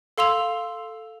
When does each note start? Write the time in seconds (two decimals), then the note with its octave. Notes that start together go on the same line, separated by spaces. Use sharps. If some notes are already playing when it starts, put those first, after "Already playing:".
0.18 A4 F5 C6 E6 F7